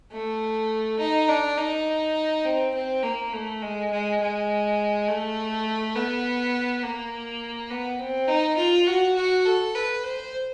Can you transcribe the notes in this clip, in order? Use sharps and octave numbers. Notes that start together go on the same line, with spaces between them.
A3
D#4
D4
D#4
C4
C4
A#3
A3
G#3
G#3
G#3
A3
B3
A#3
B3
C4
D#4
F4
F#4
F#4
A4
B4
C5